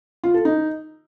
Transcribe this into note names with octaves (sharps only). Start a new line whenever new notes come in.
F4
A4
D#4